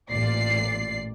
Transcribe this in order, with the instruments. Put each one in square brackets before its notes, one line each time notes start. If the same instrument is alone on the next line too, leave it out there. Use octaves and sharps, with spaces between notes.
[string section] A1 A#2 D5 C7